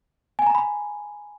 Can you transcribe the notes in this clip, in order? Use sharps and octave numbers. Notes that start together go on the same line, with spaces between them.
G#5
A#5
B5